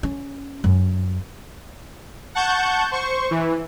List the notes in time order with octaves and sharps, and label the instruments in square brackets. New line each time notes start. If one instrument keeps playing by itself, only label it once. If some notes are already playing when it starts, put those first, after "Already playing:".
[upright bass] C#4
F#2
[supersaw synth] F#5 A5 C#6 G6
C5 C#6
E3